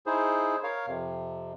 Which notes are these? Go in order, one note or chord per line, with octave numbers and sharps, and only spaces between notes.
D#4 E4 G#4 C5
A#4 C#5 F5
F2 C3